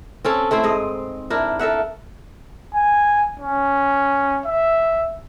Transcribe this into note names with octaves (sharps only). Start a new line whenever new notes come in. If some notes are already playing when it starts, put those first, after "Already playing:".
C4 C#4 A4
A3 C4 E4 C5
G#2 D#5
D4 E4 A#4
A4 A#4 E5 F#5
G#5
C#4
E5